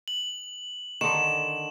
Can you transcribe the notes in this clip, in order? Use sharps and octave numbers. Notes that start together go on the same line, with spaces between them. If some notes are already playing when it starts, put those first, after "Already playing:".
F#7
D3 D#3 E7